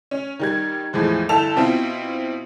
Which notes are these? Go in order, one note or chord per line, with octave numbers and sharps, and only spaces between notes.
C#4
D#3 G3 G#6
E2 A2 E3 F3 G#3
G1 E4 A4 A5 F7
B2 C4 E4 F4